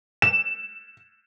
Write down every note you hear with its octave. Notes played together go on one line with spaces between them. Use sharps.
E7